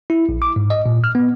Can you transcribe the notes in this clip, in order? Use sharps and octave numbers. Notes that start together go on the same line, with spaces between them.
E4
A#1
D6
G#2
D#5
A#2
F6
B3